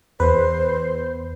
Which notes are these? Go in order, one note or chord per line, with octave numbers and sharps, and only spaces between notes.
E2 B4 C5